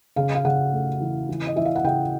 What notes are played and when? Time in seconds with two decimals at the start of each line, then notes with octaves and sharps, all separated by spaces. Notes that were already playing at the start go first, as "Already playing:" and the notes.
0.16 C#3 F5
0.35 F5
0.45 C#3 F#5
0.73 A3
1.00 E3
1.29 E3
1.47 D#5
1.56 E3 E5
1.65 F5
1.75 F#5
1.84 C#3 G5